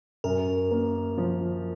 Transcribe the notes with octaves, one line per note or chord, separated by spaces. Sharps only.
F#2 A#4
A#3
F3